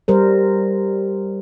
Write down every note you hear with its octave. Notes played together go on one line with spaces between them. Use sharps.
G3 A#4 C5